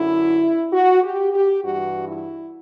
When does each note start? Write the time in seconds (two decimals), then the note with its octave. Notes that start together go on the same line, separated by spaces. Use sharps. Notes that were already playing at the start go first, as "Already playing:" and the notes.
Already playing: F#2 D3 E4
0.73 F#4
1.02 G4
1.33 G4
1.62 G2 E3 F#4
2.07 E4